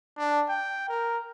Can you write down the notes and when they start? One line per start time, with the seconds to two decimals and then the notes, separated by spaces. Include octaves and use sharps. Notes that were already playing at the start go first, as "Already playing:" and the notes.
0.18 D4
0.49 G5
0.89 A#4